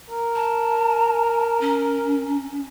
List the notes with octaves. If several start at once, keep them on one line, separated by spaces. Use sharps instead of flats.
A#4
A5
C#4